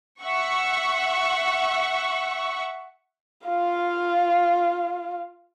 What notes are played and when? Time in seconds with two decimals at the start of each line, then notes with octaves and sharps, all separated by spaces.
0.21 E5 F#5 C#6
3.47 F4 F5